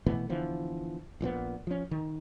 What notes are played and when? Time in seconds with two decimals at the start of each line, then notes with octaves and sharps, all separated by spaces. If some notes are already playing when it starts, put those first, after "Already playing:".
0.06 B2 E3 A3 B3
0.29 D3 E3 F3 B3
1.21 A#1 A#2 F3 B3
1.67 F3 C#4
1.91 D#3